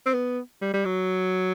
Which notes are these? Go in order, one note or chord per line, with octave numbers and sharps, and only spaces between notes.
C4
B3
G3
G3
F#3